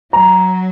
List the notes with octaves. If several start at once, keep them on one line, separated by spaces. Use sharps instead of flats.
F#3 A#5